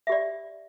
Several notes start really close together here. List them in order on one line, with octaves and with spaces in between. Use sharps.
E5 G4 D5